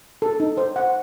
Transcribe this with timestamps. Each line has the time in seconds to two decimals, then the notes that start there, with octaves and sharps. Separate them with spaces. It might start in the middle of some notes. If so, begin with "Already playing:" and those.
0.22 A4
0.40 D#4
0.57 C5
0.76 F#5